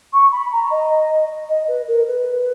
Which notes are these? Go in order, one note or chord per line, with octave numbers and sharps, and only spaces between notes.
C#6
B5
A#5
D#5
D#5
B4
A#4
B4